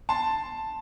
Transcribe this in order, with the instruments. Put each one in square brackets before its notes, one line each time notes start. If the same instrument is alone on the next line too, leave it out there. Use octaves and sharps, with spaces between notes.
[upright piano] A5 C6